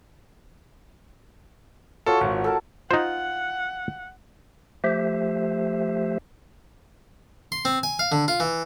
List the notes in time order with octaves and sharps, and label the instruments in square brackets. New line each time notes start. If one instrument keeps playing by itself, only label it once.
[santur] F4 F#4 C#5 [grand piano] A4
[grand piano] G#1 [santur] F#5
[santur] A4 A#4 A5
[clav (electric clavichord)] D#4 C5 [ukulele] F4 [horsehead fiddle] F#5
[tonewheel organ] F3 A3 G4 C5 E5
[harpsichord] C6
C4
G#5
F5
D3
F4
E3